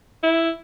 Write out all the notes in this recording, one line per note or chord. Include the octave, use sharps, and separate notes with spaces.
E4